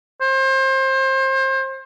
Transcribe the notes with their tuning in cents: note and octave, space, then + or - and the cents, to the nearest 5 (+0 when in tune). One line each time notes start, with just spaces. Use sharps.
C5 +30